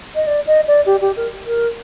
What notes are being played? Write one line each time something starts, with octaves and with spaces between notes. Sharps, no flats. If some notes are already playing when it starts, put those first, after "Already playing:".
D#5
D5
D#5
D5
G4
G4
A#4
A#4